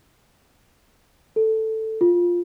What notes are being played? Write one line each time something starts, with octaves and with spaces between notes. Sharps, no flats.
A4
F4